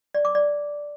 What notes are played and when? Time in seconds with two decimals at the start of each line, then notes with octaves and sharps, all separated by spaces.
0.14 D5
0.25 D6
0.35 D5